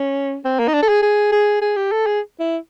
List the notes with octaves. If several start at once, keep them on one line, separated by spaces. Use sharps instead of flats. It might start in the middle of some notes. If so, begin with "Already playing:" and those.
Already playing: C#4
C4
A#3
D#4
D4
A4
G#4
G#4
G#4
G#4
G4
A4
G#4
E4